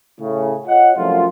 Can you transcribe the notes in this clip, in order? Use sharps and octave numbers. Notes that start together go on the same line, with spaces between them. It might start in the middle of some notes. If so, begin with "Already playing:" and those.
A2 C#3
F4 C#5 D#5 F#5
C2 F#2 F3 A3 F4